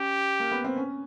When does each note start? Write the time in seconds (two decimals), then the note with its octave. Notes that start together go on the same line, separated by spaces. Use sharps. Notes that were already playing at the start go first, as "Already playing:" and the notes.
Already playing: C#4 G4
0.40 A#3
0.51 B3
0.64 C4
0.76 C#4